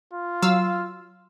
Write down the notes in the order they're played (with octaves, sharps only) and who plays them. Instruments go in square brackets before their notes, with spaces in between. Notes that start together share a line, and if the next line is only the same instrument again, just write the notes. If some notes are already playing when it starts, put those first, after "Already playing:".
[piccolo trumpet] F4
[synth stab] F#3 F5 E6